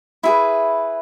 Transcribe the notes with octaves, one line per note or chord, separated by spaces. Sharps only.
E4 G#4 B4 E5